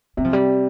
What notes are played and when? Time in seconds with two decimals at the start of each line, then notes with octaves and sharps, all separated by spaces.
0.17 C3 G3
0.24 F3
0.33 G3